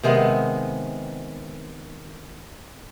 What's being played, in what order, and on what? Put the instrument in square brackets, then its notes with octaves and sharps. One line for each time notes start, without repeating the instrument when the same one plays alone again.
[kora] C3 D#3 G#3 B3